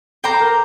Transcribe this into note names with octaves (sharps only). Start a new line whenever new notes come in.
A4 C5 G5 A#5 D6
A#4